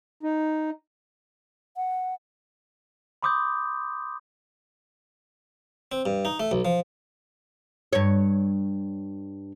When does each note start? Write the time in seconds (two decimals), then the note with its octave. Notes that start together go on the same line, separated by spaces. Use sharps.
0.23 D#4
1.77 F#5
3.23 B5 C6 D6 D#6 G6
5.92 C4
6.06 G2
6.25 D#4
6.40 A3
6.51 B1
6.65 F3
7.93 G2 C#5